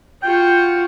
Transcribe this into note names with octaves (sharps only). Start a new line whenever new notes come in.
F4 F#4 G5